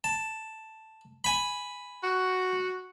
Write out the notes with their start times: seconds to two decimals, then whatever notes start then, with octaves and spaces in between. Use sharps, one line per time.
0.04 A5
1.24 G#5 B5
2.03 F#4